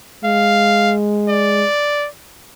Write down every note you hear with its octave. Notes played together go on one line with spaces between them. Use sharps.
G#3 F5
D5